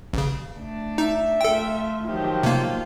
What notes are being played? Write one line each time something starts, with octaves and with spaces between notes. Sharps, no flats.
A1 C#3
A3 D4
D#4 E5
A3 F4 A4 G5
D#3 F3 F#3 G4
C3 A#3 F4